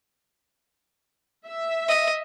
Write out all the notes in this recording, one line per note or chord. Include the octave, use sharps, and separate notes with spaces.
E5
D#5